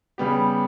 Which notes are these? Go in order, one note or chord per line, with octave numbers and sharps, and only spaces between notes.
C#3 G3 B3 G4